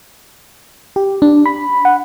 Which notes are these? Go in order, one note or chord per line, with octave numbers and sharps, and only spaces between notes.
G4
D4
B5
F#5